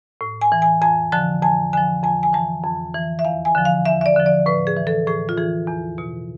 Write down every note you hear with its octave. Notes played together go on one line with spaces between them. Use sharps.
A2
G#5
E3
G#5
F2 G#5
D3 F3 A5
F2 G#5
D3 F3 G#5
F2 G#5
G#5
E3 A5
F2
E3
E5
E2 F5
G#5
D3 F3
F5
E2 E5
E5
D5
D3 F3
D5
A2 B4
G#4
E3
A4
A2 G#4
F4
E3 G#4
E2
B2